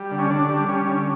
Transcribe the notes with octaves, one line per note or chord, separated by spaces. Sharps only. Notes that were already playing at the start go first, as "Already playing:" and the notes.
Already playing: G3
D3
C#4
D3 D4
G3
G3 C#4
D3